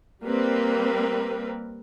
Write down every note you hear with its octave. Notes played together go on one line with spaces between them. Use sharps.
G3 A#3 C4 A#4 B4